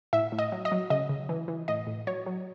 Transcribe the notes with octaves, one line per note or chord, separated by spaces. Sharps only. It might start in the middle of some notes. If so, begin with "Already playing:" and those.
A2 E5
A2
D#5
F#3
D#5
F#3
C#3 D#5
C#3
E3
E3
A2 D#5
A2
F#3 C#5
F#3